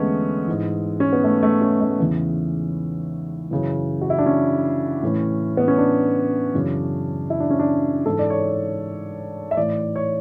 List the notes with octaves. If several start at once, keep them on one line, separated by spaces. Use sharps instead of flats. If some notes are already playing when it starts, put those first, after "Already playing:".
Already playing: E2 D3 G#3 A3 B3 C#4
G#2 E3
C#4
B3
A3
A3
C#4
A3
E2 C#3 E3
F#2 C#3 E3
F#4
E4
D4
C#4
A2 E3
B3
C#4
D4
F#2 C#3 E3
E4
D4
C#4
D4
G#2 E3 A4
D5
C#5
E5
A2 E3 D5
C#5